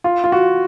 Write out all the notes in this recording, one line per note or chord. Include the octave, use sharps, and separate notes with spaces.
F4
F4
F#4